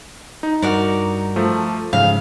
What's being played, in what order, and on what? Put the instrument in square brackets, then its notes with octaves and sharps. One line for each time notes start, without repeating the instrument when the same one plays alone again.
[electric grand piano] D#4
[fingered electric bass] G2 [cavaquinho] F#4 A#4 D5
[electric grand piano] F3 A3
[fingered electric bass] G#2 F3 [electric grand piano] C#3 [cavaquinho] F5